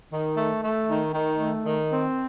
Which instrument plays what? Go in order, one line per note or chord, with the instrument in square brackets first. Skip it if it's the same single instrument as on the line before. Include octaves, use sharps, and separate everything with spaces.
[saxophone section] D#3
A3
A3
D#3
D#3
A3
D#3
C4